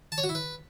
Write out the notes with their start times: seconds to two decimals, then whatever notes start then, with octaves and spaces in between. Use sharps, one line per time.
0.12 A5
0.18 C#5
0.24 F#4
0.29 E4
0.35 B4